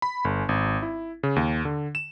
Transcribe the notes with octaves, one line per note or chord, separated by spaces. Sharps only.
B5
G1
G#1
E4
C#3
D#2
D3
E7